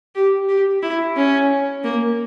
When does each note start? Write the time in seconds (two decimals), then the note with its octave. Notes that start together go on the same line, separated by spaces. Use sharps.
0.15 G4
0.49 G4
0.82 E4
1.16 C#4
1.84 A#3